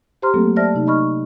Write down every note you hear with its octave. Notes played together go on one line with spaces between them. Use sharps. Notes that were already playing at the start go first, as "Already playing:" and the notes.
G4 C5 A#5 C6 F6
F#3 A3 A#3 C4 A4
C5 D5 E5 A5 F6 A#6
C3 D#4
D#5 B5 C#6 F6